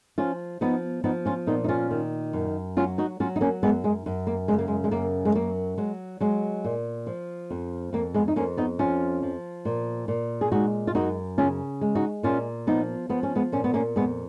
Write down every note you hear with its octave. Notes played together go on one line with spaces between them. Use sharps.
F3 C#4 F4
F3 B3 D#4
F3 B3 D#4
C#4 F4
A#2 B3 D#4
D#4
C#4 F4
D#3
F#2
F#3 C#4 F4
D#4 F#4
F#3 C#4 F4
D#4
A#3 C#4
F#2 G#3 B3
G#3
F#2
A#3
C#3 G#3
A#3
G#3
G#3
F#2 A#3
G#3
F#3 A#3
F#3 G#3
F#3 G#3
A#2
F3
F2
F2 A#3
G#3 B3
D#4
F2 A#3 C#4
B3 D#4
F3 C#4 F4
F3
A#2
A#2
G#4
G#3 D#4 F#4
F4
F#2 D#4 F#4
C#3 C#4 F4
G#3
D#4 F#4
A#2 C#4 F4
F3 B3 D#4
F3 B3
C#4
G#3 B3
A#2 C#4
B3
A#3 C#4
F2 G#3 B3